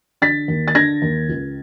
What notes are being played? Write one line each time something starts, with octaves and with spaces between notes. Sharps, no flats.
D3 A6 B6
D#2
A6
D3 G#6 A#6
D#2
C#2